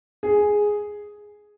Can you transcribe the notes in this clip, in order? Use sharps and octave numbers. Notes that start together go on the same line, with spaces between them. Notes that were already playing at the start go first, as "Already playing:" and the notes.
G#4